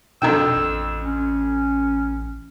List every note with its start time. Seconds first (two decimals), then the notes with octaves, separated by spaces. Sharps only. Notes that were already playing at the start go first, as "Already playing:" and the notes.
0.22 F2 B2 D3 G5 E6
0.56 A1
1.01 C#4